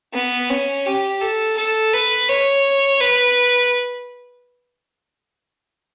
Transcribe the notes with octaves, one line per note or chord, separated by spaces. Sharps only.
B3
C#4
G4
A4
A4
B4
C#5
B4